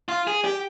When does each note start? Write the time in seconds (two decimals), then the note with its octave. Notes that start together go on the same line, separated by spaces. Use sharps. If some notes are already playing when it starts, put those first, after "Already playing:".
0.09 F4
0.27 G#4
0.44 G4